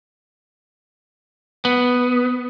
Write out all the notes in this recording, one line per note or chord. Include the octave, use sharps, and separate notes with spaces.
B3